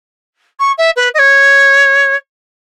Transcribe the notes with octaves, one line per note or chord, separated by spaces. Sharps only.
C#6
E5
B4
D#5
C#5